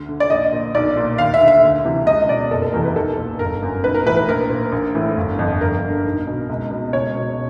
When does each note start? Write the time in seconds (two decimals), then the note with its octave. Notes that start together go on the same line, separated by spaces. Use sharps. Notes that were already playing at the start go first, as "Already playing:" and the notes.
Already playing: D2
0.09 D3
0.20 D5
0.30 A#1 D#5
0.52 A#2
0.75 B1 D5
0.97 A#2
1.18 D#2 F5
1.34 E5
1.41 D3
1.48 E5
1.63 D2
1.85 C3 E3
2.07 C#2 D#5
2.29 B2 D5
2.51 F#1 A4
2.62 A4
2.73 E2 C3 E3 A#4
2.85 B4
2.96 B1 A4
3.17 A#2
3.39 G1 A#4
3.61 F#2 D3
3.84 B1 B4
3.94 A#4
4.06 A2 E3 B4
4.16 B4
4.29 A#1 A#4
4.50 A#2
4.72 A#1
4.95 A2 E3
5.17 G1
5.38 F2 D3
5.61 G1 A#4
5.82 G2 D3
6.05 B1
6.27 B2
6.49 C#2
6.71 B2
6.93 C#2 C#5
7.15 B2